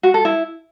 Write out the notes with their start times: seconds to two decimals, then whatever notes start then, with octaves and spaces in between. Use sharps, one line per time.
0.03 F#4
0.14 A4
0.25 E4